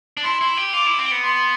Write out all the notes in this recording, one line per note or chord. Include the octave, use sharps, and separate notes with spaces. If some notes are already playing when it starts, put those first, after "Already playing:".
D4
E4 C6
E4
G4
F4 D6
E4
C4
B3
C6